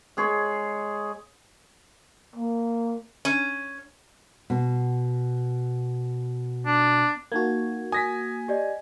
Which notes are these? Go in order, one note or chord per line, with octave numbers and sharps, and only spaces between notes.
G#3 G#4 C#5
A#3
C#4
B2
D4
A#3 D#4 F#4 G#6
G#5 D#6 A#6 B6
G4 D5 D#5